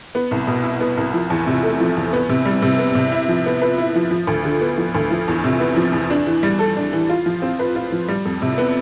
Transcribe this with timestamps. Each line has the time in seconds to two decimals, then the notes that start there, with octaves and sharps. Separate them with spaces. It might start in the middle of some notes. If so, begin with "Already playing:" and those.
0.15 B3
0.31 C2
0.47 B2
0.64 E4
0.80 B3
0.97 C2
1.14 F3
1.30 E2
1.47 C3
1.63 A3
1.80 F3
1.97 E2
2.13 B3
2.29 C3
2.45 G3
2.62 C3
2.79 B3
2.95 C3
3.12 E4
3.28 F3
3.46 B3
3.62 B4
3.78 E4
3.95 F3
4.11 F3
4.27 D2
4.45 D3
4.61 B3
4.78 F3
4.95 D2
5.11 F3
5.28 E2
5.44 C3
5.60 B3
5.76 F3
5.93 E2
6.10 D4
6.27 E3
6.43 G3
6.59 A4
6.77 D4
6.93 E3
7.10 F4
7.26 F3
7.42 C4
7.59 B4
7.76 F4
7.92 F3
8.08 G3
8.25 F2
8.42 C3
8.58 B3